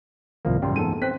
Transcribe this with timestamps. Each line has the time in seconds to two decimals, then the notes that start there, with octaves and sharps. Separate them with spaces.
0.45 C2 G#2 C3 D#3 F3 A#3
0.62 F#2 G3 G5 C6
0.76 G#2 E3 A#3 B3 A4 D#7
1.02 C4 C5 G5 F#6 B6